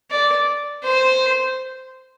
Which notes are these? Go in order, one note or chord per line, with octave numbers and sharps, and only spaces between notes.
D5
C5